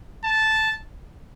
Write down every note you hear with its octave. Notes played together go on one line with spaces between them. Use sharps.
A5